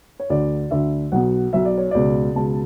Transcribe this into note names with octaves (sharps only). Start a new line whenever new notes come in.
C#5
D2 D3 D5
D2 D3 E5
B1 B2 F#5
B1 B2 E5
D5
C#5
C#2 B2 D5
C#2 B2 A5